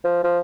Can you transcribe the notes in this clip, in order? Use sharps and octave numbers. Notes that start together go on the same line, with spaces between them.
F3
F3